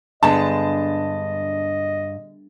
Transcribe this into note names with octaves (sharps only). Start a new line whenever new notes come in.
G2 D3 G#3 B3 D#5 A5